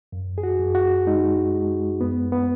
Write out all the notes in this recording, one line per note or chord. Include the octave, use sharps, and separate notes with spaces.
F#2
G#4
F#4
F#2
F#4
G#3 D#4
G#3
F#2 B3
B3